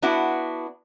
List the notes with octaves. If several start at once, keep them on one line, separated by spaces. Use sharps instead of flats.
B3 D4 E4 F#4